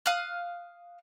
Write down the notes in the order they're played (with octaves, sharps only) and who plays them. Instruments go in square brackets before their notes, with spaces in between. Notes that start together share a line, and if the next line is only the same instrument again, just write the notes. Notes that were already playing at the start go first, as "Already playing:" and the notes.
[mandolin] F5 D#6 F6 F#6